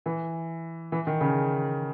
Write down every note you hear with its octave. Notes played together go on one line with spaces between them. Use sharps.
E3
E3
D#3
C#3